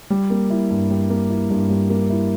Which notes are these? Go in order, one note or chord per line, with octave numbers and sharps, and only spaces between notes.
G3
A#3
E4
G2
G3
A#3
E4
G2
G3
A#3
E4